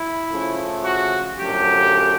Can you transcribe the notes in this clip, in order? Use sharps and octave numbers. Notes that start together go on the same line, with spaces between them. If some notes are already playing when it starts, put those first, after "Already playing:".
Already playing: E4
C#3 F3 A3
F#4
F#2 D3 F3 A3 G4